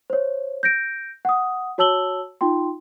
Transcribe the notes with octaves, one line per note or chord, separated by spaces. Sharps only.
C5 C#5
G6 A#6 D7
F#5 D#6
F#4 C#5 A5 E6 F#7 G7
D#4 F4 G5 C6